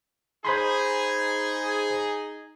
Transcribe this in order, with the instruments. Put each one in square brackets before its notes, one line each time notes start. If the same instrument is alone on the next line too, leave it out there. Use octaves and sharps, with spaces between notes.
[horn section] D#4 G#4 [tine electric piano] C5 B5 C6